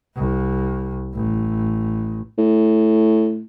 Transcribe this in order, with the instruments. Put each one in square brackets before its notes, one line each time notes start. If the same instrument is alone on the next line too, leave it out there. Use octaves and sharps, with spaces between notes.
[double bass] C2
A1
[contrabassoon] A2